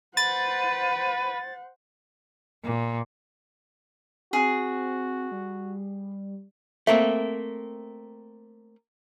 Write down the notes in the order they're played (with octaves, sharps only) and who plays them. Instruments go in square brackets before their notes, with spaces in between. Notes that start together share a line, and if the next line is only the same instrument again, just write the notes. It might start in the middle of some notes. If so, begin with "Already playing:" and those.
[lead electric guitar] B4 [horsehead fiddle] C5 F#5 [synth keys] A6
[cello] A#2
[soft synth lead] C4 [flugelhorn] F#4 [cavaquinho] G#4
[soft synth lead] G3
[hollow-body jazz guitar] A3 A#3 C4 [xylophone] E5